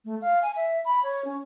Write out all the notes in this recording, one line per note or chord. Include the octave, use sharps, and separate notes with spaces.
A3
F5
G#5
E5
B5
C#5
C#4